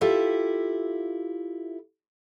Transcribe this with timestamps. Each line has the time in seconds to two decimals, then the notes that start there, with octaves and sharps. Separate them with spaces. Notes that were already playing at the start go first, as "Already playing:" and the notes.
0.01 E4 F4 G4 A4 E5